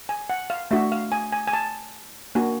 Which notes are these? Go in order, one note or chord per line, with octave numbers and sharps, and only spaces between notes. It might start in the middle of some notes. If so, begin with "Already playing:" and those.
G#5
F#5
F5
A3 D4 F#4 E5
F5
G#5
G#5
G#5
A5
A#3 D4 F#4 G#5